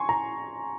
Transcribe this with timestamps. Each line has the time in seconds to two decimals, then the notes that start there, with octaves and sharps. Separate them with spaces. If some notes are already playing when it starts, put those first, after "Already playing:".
Already playing: G#5 C6 C#6
0.09 A#5